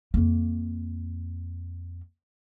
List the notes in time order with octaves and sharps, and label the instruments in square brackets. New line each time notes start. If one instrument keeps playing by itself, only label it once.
[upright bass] F2 A#3